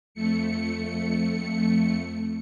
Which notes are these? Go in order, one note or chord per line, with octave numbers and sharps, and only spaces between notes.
F2 A3 C#7